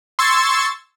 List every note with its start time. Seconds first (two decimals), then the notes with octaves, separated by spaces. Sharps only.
0.19 C6 C#6 E6 G#6 A6